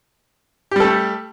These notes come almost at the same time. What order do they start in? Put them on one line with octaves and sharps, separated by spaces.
G4 G3 A4 A3